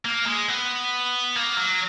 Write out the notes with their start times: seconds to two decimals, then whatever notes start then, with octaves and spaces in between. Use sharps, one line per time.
0.05 A#3
0.26 G#3
0.49 B3
1.36 A#3
1.57 F#3